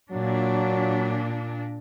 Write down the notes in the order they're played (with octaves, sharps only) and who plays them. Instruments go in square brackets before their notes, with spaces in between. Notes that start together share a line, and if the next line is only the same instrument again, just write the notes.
[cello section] A#2 D4 [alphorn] F#3